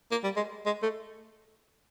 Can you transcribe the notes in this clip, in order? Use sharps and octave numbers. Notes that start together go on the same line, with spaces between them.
A#3
G3
G#3
G#3
A3